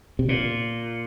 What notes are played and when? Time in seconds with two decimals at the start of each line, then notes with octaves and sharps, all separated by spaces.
0.19 C3
0.29 A#2